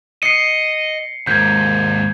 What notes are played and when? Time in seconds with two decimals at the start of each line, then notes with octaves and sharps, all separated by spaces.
0.23 D#5 C7 C#7
1.27 D#2 G#2 G6 G#6